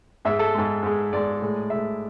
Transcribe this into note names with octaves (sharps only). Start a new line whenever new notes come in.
G#2 G#3 E5
A4
G#2 G#3
G#2 G#3
G#2 G#3 D5
A2 G#3
A2 G#3 E5